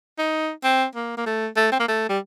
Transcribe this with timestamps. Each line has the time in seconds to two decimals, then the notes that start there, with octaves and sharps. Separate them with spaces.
0.18 D#4
0.64 C4
0.96 A#3
1.17 A#3
1.26 A3
1.57 A3
1.72 C4
1.80 A#3
1.88 A3
2.09 G3